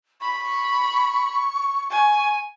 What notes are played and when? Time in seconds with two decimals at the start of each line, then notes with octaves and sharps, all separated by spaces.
0.21 B5 C#6
1.90 G#5